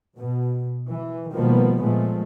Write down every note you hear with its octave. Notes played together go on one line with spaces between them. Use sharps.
B2
E3
B2 D#3 F3 G3 A#3 B3
A#2 F3 G#3 A3